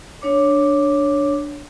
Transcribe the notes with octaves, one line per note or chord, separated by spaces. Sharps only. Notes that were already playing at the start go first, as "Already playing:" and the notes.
D4 C#5 D6